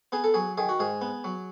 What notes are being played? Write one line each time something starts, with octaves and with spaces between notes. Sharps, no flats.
B3 G#4
A4
F#3 G#4
D#3 G#4
F#4
G#2 G#4
B3
F#3